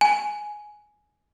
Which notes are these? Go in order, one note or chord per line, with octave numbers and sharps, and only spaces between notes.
G#5